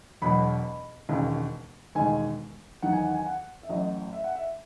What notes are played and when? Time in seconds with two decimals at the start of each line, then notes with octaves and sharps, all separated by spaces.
0.22 E1 E2 B2 F#3 B5
1.09 E1 D#2 C#3
1.95 E1 D#2 D#3 G#3 G#5
2.82 E2 D#3 F#3 F#5
2.93 G#5
3.04 F#5
3.14 G#5
3.26 F#5
3.63 E5
3.69 A1 A2 F#3 D#5
4.13 E5
4.24 F#5
4.35 E5